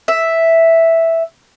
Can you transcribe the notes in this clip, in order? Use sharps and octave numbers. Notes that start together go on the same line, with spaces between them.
E5